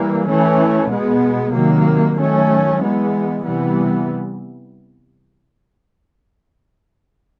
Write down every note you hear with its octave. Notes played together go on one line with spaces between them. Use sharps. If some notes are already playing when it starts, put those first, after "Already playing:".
Already playing: E3 G3 A#3
E3 A3 C#4
B2 G#3 B3
C3 D#3 F#3 A#3
D#3 F#3 A3 C#4
E3 G#3 B3
C3 E3 G3 B3